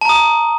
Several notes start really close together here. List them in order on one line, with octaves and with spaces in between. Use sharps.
A5 A#5 D#6